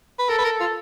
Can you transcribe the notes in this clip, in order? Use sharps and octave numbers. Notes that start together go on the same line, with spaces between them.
B4
A4 A#4
B4
A#4
F4